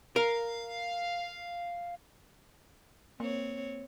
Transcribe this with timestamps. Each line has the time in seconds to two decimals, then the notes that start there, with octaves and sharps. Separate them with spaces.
0.16 A#4 F5
3.20 A#3 C4 C#5